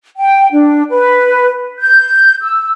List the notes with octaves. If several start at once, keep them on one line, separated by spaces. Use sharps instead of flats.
G5
D4
B4
G6
E6